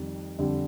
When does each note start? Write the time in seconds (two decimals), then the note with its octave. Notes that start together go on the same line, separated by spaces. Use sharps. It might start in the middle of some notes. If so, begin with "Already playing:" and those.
Already playing: F2 D#3 G3
0.39 F2 D3 G3